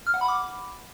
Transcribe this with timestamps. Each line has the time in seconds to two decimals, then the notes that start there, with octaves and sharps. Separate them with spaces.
0.07 F6
0.14 F#5
0.21 B5
0.28 D6